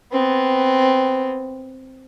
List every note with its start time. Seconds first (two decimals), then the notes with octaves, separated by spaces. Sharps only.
0.12 B3 C4